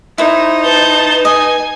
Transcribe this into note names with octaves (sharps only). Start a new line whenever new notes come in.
D#4 E4 C5
B4 A5 G6
D#5 G#5